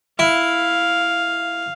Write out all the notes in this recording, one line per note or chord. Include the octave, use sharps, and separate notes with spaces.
E4 F5